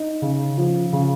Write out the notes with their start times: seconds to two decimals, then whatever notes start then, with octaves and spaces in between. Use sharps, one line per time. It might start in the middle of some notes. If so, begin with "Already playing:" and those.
Already playing: D#4
0.22 C#3
0.58 F3
0.93 C#3